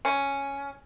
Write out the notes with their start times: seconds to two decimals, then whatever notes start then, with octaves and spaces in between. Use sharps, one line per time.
0.05 C#4